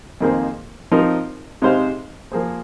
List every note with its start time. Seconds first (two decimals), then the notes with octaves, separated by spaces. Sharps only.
0.21 F2 D#3 A#3 G#4 C5
0.92 F3 C4 D#4 A#4
1.62 C3 G#3 D#4 C5 F5
2.32 F3 A#3 G#4 C5